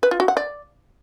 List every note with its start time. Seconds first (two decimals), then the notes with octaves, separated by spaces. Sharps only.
0.03 B4
0.11 F4
0.20 F#4
0.28 F#5
0.37 D5